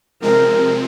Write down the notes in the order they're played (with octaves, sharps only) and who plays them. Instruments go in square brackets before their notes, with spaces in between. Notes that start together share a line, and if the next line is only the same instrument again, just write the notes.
[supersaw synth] C3 F3 G#3 C4 [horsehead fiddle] A#4